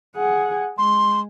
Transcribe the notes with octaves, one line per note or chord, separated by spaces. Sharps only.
G#4 F#5
G#3 C6